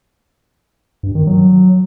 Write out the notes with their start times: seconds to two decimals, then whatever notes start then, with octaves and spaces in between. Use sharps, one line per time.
1.03 G2
1.15 D#3
1.27 F#3